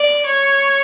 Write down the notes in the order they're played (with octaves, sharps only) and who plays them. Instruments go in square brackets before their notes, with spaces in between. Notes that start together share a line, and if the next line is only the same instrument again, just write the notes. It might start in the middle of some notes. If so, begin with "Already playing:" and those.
Already playing: [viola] D5
C#5